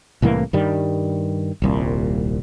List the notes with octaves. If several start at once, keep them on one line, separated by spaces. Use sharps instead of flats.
C2 A2 E3 A#3
G2 D#3 G3
D#1 C2 A#2